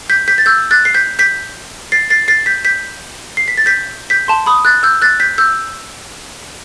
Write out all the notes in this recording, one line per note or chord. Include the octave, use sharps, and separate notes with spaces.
G6 B6
G6 B6
A6
E6 G6
F#6 A6
C7
G6 B6
G6 B6
A6 C7
A6 C7
A6 C7
G6 B6
G6 B6
C7
B6
A6
G6 B6
G6 B6
A5 C6
B5 D#6
F#6 A6
E6 G6
F#6 A6
G6 B6
E6 G6